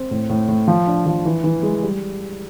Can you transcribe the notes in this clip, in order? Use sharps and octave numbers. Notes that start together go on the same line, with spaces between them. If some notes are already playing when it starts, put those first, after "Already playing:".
Already playing: C4
A2
A2
A2
F3
D4
F3
E3
E3
G#3
G3